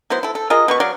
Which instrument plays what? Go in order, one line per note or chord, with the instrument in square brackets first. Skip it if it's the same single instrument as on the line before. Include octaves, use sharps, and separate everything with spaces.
[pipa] F#3 B3 E4 C5
E4 A4
A4
F4 G#4 A#4 D#5
B2 B4 C#6
F#3 D5 F5